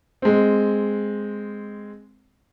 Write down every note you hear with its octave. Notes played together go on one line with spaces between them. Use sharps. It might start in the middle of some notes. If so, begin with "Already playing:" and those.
G#3 C4